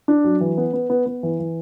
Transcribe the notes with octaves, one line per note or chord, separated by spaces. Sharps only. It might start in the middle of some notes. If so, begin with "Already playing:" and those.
D4
F#3
E3
B3
B3
B3
B3
E3
E3